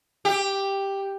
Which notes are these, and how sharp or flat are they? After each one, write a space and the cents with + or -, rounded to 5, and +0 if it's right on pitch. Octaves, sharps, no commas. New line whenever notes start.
G4 +5